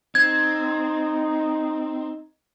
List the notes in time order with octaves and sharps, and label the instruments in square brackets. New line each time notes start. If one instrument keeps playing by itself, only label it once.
[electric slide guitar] C4 [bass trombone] D#4 [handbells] G#6